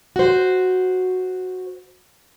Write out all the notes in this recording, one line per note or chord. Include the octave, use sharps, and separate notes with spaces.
F#4 C5